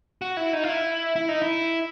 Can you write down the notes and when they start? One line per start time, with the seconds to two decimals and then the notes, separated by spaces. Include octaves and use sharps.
0.22 F#4
0.37 E4
0.53 D#4
0.64 F4
0.69 E4
1.16 E4
1.29 D#4
1.42 E4